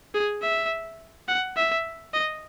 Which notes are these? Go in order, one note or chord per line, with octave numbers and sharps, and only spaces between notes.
G#4
E5
F#5
E5
D#5